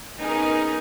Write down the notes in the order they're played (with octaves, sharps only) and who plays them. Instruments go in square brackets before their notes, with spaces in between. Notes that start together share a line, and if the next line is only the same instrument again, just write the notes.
[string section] B3 C#4 D#4 G#4 A#4